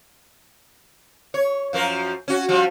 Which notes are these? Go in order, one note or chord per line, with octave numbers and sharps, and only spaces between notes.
C#5
F#2 F3 A#4
C#4 F#4
F3 G3